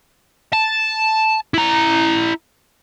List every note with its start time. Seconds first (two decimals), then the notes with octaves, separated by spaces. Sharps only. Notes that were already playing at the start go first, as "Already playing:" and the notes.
0.53 A5
1.54 E4 A#5